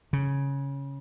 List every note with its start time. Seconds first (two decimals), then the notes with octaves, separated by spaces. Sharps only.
0.13 C#3